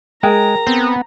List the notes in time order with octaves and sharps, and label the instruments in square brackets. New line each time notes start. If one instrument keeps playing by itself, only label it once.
[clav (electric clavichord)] G#3 [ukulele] G#4 A#4 G5 [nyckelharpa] A#5
[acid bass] B3 [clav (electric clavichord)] C4